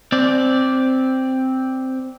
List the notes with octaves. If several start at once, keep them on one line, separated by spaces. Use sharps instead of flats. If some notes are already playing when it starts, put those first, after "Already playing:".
C4 D5